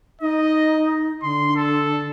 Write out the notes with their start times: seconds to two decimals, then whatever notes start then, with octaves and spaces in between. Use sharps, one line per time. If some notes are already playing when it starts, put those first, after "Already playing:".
0.21 D#4 D#5
1.23 D3 C6
1.56 A4